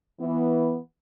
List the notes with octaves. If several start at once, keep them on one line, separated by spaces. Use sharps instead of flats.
E3 B3